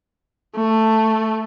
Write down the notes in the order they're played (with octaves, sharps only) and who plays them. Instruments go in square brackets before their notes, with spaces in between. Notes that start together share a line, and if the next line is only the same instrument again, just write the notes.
[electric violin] A3